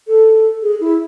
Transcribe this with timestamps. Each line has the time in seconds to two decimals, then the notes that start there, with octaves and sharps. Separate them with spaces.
0.08 A4
0.62 G#4
0.81 E4